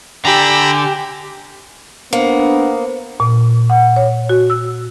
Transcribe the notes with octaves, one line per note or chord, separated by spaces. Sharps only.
D3 G4 G#5 A#5 B5 E6
A#3 B3 D4 C5 C#7
A#2
F#5
C#5
F#4
E6